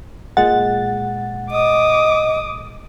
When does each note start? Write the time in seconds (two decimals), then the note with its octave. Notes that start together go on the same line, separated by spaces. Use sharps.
0.37 A#2 G#3 F#5 A6
1.51 D#5 D6 D#6